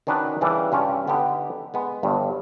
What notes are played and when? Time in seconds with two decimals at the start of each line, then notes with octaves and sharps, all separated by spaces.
0.07 D#3 C#4 D4 F#4 B4
0.41 C#3 E3 G3 D4
0.72 G2 C#4 F4 G4
1.08 D3 B3 D#4 G4
1.74 G#3 B3
2.03 G1 G2